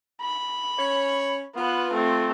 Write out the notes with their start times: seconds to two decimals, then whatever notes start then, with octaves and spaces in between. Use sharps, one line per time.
0.21 B5
0.78 C#4 C#5
1.56 B3 F4 B4
1.93 A3 C4